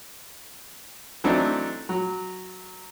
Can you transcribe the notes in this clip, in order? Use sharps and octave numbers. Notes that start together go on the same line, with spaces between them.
E3 F#3 A3 C4 D4 D#4
F#3